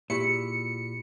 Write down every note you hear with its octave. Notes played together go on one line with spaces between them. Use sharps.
A#2 E4 G4 G#4 C#7